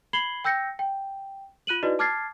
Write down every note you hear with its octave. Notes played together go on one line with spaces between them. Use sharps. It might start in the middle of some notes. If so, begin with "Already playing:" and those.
B5 G#6 C7 F#7 G7
G5 E6 G6 A#6 C#7
G5
F4 F#6 D#7 F#7
D#4 E4 F#4 B4 D5 D#5
A5 D6 F6 G#6 A6 C7